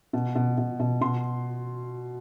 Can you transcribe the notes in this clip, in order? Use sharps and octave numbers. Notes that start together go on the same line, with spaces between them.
B2
B2
B2
B2
B2 C6